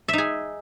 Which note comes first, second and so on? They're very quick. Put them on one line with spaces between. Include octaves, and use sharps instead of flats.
E5 D#4 G#4